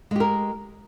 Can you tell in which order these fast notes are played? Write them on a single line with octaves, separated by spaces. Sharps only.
G#3 G4 A#4